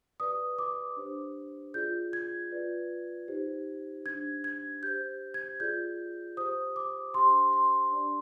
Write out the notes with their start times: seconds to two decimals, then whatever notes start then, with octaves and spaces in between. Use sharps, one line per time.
0.20 G4 B4 D5 D#6
0.58 D6
0.97 D4 G4 C5
1.74 F4 G#4 D5 G6
2.13 G#6
2.51 F4 B4 D5
3.28 D#4 G4 C5
4.06 D4 G4 C5 G#6
4.44 G#6
4.83 G4 C5 G6
5.34 G#6
5.60 F4 G#4 D5 G6
6.37 G4 C5 D#6
6.76 D6
7.14 D4 G4 C5 C6
7.53 C6
7.91 D4 G4 D5